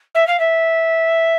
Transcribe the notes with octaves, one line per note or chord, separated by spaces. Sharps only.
E5
F5
E5